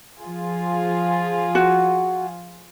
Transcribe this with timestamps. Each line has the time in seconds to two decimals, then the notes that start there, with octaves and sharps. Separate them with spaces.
0.21 F3 F4 G#4
1.55 F#4